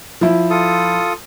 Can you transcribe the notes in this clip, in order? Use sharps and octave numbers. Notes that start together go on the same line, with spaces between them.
F3 E4
F4 A4 D#6